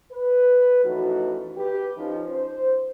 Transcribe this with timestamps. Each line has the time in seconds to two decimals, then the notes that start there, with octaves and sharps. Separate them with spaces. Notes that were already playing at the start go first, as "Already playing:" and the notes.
0.12 B4
0.83 F#2 E3 F3 A3 D#4 F#4
1.57 G4 B4
1.97 F3 C#4 D#4
2.31 C5